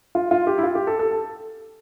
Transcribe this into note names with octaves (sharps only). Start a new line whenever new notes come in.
F4
F4
G4
E4
F4
G4
A4
A4
A4